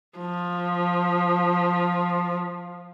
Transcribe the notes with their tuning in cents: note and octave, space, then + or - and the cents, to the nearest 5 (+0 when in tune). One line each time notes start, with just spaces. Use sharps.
F3 +10